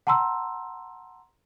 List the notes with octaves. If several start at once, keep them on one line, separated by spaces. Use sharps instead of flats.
F#5 A5 A#5 C6 E6